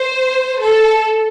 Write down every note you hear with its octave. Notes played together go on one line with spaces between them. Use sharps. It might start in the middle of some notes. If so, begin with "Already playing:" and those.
Already playing: C5
A4